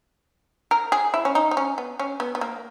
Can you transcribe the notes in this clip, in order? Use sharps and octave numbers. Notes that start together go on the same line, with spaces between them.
A#4
G#4
E4
C#4
D#4
D#4
C#4
B3
C#4
B3
B3
A#3